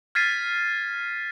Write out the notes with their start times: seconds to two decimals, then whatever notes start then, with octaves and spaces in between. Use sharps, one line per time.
0.15 F6 G#6 A6 B6 C7 D#7